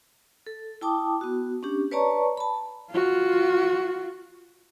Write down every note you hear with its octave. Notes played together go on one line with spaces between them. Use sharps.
A4
E4 G5 A5 D6 D#6
B3 F#4
C#4 D4 G4
B4 C#5 D5 A5 A#5 C#6
A5 B5
F4 F#4